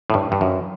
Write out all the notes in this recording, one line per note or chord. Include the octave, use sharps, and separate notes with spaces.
A2
G2
G2
F#2